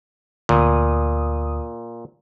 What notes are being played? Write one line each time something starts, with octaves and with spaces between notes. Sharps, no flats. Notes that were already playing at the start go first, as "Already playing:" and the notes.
D2 A#2 D#6